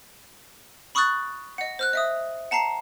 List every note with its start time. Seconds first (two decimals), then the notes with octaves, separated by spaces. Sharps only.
0.95 B5 C#6 D#6 F6 F#6 A6
1.58 D#5 F#5
1.79 C5 F6 F#6
1.93 D#5 E5 D#6
2.51 F#5 A5 A#5 C7